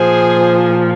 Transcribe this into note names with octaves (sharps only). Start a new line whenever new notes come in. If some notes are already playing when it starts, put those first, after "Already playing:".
Already playing: A#2 F3 G#4 C5